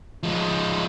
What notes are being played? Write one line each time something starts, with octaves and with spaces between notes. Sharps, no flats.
F3 G#3